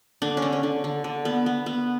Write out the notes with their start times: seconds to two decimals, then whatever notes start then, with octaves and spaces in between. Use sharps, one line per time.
0.22 D3 D4
0.37 C#4
0.42 D3
0.53 C#4
0.63 D3
0.84 D3
1.04 D3
1.25 B3
1.46 B3
1.66 B3